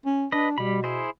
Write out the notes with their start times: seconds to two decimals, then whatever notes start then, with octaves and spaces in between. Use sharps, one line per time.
0.05 C#4
0.32 D4 B4 D#5
0.58 B2 G3 B5
0.84 E4 G#4 C5